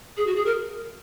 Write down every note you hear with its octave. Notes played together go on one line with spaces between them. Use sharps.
G#4
F#4
G#4
A#4